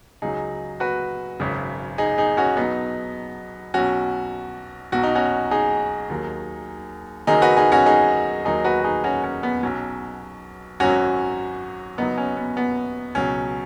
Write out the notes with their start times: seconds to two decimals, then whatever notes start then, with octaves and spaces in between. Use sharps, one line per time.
0.22 C#2 C#3 F#3 D#4 G#4
0.80 F#4 B4
1.40 G#1 F#2 C#3
1.98 D#4 G#4
2.18 D#4 G#4
2.37 C#4 F#4
2.57 B1 B2 F#3 B3 D#4
3.74 B1 B2 F#3 C#4 F#4
4.92 B1 B2 F#3 F#4
5.03 D#4
5.15 C#4 F#4
5.51 D#4 G#4
6.10 D#2 D#3 F#3
7.27 F#1 F#2 D#3 F#3 D#4 G#4
7.42 F#4 B4
7.57 D#4 G#4
7.72 C#4 F#4
7.86 D#4 G#4
8.45 D#2 D#3 F#3 D#4 G#4
8.64 F#4 B4
8.80 F#4
8.84 D#4 G#4
9.04 C#4 F#4
9.23 C#4
9.43 B3
9.63 B1 B2 F#3 C#4
10.80 G#1 F#2 F#3 C#4 F#4
11.98 F#1 F#2 F#3 B3 D#4
12.18 C#4
12.37 B3
12.57 B3
13.15 C#2 B2 F#3 C#4